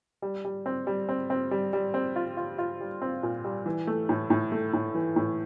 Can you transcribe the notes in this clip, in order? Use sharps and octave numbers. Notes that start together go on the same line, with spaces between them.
G3
G3
C4
G3
C4
C4
G3
G3
C4
F4
F4
F4
G3
C4
A#2
G3
E3
A3
A2
A2
A3
A2
E3
A2